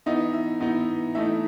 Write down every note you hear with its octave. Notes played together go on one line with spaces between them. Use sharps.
E3 B3 D#4 E5
E5
E3 B3 D#4 D#5
E3 A3 D#4 E5